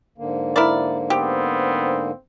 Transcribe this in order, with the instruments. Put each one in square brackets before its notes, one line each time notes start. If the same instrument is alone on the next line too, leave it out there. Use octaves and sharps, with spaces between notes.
[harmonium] G#2 D3 A#3
[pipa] E4 A#4 D5
[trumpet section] B3 C4 [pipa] G4